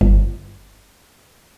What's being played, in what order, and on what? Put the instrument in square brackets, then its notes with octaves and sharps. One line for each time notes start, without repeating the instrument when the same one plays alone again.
[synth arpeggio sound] G1